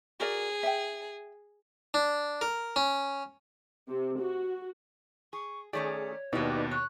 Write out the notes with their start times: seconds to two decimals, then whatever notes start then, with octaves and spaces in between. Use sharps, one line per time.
0.20 F#4 G#4 A#4 D5
0.63 E5 G5
1.94 D4
2.41 A#4
2.76 C#4
3.88 C3
4.20 F#4
5.33 G#4 C#6
5.73 D#3 A3 C#4 G#4 C#5 D5
6.33 D#2 B2 D#4 E4 G4 B4 D5
6.71 C#5 F#6